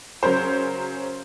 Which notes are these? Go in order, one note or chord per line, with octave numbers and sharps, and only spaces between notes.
C#3 F#3 C#4 A#4 C5